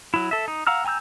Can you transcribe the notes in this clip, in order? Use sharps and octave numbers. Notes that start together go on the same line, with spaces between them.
F#3 E4
A4 E5
D#4
F5 F#5 A#5 E6 F6
G5 G#5 A#5 E6 G6